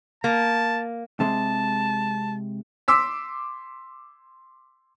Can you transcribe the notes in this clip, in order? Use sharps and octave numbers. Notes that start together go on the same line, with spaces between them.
A#3 A5
C3 G#3 A5
C6 D6 E6 B6